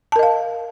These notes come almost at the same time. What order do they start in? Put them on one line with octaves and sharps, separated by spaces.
A5 A#4 D#5 F5